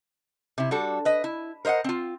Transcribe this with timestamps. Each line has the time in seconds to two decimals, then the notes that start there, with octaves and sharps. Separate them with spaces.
0.58 C3 E4
0.71 G3 D4 F#4 A4
1.05 B4 D#5
1.24 E4
1.65 A#4 C5 D#5 F5 F#5
1.84 C4 F4